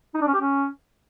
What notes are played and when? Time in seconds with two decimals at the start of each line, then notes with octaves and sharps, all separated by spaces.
0.14 D#4
0.21 D4
0.27 C#4
0.34 G4
0.41 C#4